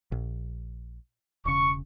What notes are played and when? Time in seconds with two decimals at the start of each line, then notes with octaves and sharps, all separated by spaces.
0.12 A#1
1.45 E1 C#3 C#6